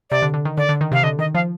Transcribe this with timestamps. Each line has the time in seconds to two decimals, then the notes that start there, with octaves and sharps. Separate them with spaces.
0.11 C3 D5
0.22 D3
0.34 D3
0.45 D#3
0.58 D3 D5
0.69 D3
0.81 D#3
0.92 C3 F5
1.03 D3 D#5
1.19 D#3 D#5
1.35 F3 F5